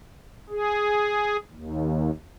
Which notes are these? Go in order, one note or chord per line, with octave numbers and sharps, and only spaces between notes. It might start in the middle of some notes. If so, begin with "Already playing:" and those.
G#4
D#2